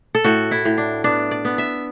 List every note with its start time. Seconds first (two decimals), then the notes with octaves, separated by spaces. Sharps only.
0.15 A4
0.24 A2 F#4
0.51 E4
0.65 A2
0.78 D4
1.04 B3 D4
1.31 D5
1.45 B3
1.58 E5